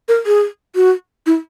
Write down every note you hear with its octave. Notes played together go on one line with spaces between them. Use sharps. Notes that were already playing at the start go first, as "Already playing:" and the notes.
A#4
G#4
F#4
E4